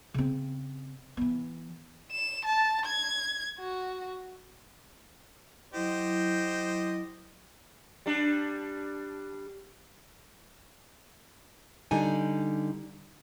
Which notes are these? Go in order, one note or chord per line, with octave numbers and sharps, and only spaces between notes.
C#3 C4
E3 B3
E7
A5
G#6
F#4
F#3 E4 G4 C5 D#5
G3 D4
D3 G3 D#4 G#5